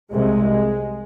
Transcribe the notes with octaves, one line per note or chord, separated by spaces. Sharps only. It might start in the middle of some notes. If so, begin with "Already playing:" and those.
C2 C3 G#3